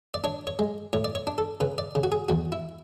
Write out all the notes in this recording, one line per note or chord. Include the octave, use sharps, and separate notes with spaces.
D5
D4 C#5
C#5
G#3
A2 C#5
D5
C#5
D4
A4
C#3 B4
D5
C#3
F#4
G#4
E2 F#4
E4